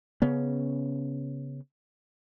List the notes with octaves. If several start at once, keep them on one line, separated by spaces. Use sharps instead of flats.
C#3 B3 C#4